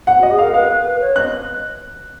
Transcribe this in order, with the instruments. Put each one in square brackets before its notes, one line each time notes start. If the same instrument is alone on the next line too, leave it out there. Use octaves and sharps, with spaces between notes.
[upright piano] F#5
[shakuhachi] F#4 [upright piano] D#5
[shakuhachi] G#4
[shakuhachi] A#4 [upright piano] F5
[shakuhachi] B4 [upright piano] F5
[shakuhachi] C#5
[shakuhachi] D#5 [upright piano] F#6